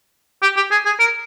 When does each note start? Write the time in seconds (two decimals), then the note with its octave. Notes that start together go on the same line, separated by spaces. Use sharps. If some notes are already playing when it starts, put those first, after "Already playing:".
0.42 G4
0.56 G4
0.71 G#4
0.86 G#4
1.00 A#4